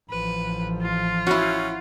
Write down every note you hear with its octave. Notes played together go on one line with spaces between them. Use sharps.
A1 F3 B4
F4
C#4 E4 F#4